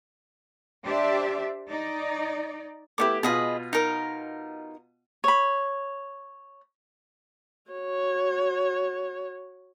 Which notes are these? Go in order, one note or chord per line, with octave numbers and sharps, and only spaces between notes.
D4 G4 C5 D5 E5
D#4 D5
A3 B3 E4 G4 C#5 D6
B2 F4 G#4 D#5 B5
D#4 A#4
C#5 B5
F#4 C#5